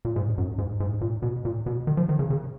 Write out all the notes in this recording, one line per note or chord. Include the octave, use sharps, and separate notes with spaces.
A#2
G#2
F#2
G#2
G#2
A#2
B2
A#2
B2
D#3
F3
D#3
C#3
C#3